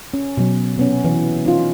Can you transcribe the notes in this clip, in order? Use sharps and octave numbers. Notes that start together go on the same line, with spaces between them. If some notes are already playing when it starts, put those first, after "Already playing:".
C#4
B2 F#3
C3 B3 C#4
E3
C#4 D#4 F4